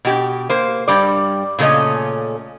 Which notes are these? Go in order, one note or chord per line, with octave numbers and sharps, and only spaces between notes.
B2 G4
A#3 C5
G2 G3 D5
A#2 C#3 A3 C#4 D#5